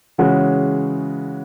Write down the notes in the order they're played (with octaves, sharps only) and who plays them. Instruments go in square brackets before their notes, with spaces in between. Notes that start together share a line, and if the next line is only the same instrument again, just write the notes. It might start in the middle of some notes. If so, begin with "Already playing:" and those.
[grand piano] C#3 E3 G#3 C#4 F#4